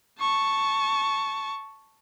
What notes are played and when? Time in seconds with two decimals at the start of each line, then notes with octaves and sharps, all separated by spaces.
0.20 A5 C#6